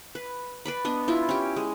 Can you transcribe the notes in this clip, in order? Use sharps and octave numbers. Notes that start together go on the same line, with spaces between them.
B4
B4 D5 B5
B3 D4 D#5
E4 F4
C#4 G4
G#3